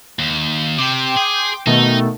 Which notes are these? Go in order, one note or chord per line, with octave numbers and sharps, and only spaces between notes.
D#2
C3 G5 C6 D6
G#4
B2 D#3 A3 D#4